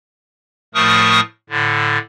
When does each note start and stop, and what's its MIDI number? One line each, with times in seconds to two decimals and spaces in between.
0.74 1.20 45
0.74 1.20 53
0.74 1.20 57
0.74 1.20 70
0.74 1.20 85
0.74 1.20 87
1.50 1.98 45
1.50 1.98 50